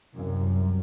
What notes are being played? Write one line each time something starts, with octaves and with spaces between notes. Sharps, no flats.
C2 F#2